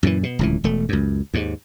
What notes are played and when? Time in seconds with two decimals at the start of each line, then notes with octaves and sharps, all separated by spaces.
0.03 F#2 A#2 C#3 E3
0.23 B2
0.39 D1 C#2 E3
0.64 E1 A3
0.89 C#2 F#2
1.34 D#2 G#2